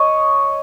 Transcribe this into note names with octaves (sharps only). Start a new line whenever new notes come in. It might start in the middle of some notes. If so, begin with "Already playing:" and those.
Already playing: C#5 D#5